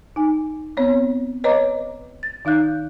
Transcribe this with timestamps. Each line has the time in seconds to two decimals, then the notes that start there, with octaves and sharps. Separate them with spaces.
0.16 D#4 G#5
0.77 B3 C4 C#5
1.44 B4 C#5 D#5 A#5 D6
2.23 A6
2.45 D#3 D#4 F5 F#6 G6